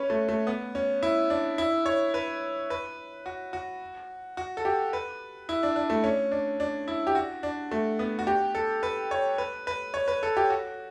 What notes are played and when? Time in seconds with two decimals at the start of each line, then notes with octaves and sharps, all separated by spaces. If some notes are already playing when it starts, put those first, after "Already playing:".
Already playing: C#4 B4 C#5
0.10 A3
0.29 A3
0.47 B3
0.75 C#4
1.03 E4
1.30 D4
1.58 E4
1.86 C#5
2.14 B4
2.70 B4
3.26 F#4
3.53 F#4
4.37 F#4
4.57 A4
4.65 G4
4.93 B4
5.49 E4
5.63 D4
5.76 D4
5.90 A3
6.04 C#4
6.31 D4
6.60 D4
6.88 E4
7.07 G4
7.15 F#4
7.43 D4
7.71 A3
7.99 B3
8.19 F#4
8.27 G4
8.55 A4
8.83 B4
9.11 C#5
9.38 B4
9.67 B4
9.94 C#5
10.08 B4
10.23 A4
10.37 G4
10.50 F#4